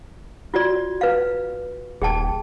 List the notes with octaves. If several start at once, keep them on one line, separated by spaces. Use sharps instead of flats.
F4 F#4 D5
B4 F5
D#1 G#4 G5 A5